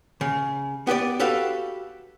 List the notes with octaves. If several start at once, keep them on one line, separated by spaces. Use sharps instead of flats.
C#3
B3 G4 B4 D5
F#4 G4 A4 B4 F5 F#5